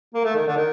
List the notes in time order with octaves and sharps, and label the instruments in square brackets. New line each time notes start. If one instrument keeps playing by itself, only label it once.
[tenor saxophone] A#3
A3
D#3
D3
D#3